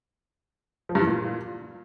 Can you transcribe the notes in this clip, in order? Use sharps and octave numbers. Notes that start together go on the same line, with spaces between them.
F3
G2
E3
A#2